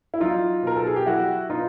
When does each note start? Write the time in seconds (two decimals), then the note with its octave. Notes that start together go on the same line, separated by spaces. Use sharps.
0.14 E4
0.20 F#3 D#4 F4
0.63 B2 A#4
0.77 A4
0.87 G#4
0.96 G4
1.06 F#3 E4 F#4
1.49 B2 D#4 F4